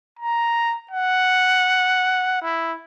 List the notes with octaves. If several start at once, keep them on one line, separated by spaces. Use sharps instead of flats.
A#5
F#5
E4